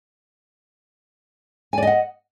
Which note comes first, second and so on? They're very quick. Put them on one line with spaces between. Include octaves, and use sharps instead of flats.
G#5 D5 D#5 F#5